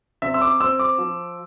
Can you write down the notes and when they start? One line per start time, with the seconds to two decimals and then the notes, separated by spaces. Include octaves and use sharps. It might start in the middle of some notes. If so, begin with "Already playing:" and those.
0.22 C3 E5
0.34 E6
0.41 D6
0.60 C4 E6
0.79 D6
0.98 F3